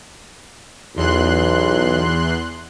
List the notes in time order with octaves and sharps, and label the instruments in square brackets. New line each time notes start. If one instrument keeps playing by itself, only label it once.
[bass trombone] B1 [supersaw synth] E2 C6 F#6